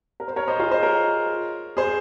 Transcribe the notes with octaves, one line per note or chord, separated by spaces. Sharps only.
A#4
C5
A#4 C#5
C5 D#5
F4 G#4
C5 D#5
A#4 C#5
G#4 C5